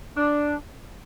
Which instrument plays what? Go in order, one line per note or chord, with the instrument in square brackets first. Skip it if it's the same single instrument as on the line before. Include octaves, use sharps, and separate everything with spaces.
[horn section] D4